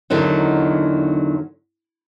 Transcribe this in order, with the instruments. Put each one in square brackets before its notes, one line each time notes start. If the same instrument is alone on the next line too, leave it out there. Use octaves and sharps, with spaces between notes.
[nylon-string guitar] E2 D3 D#3 F#3 D#4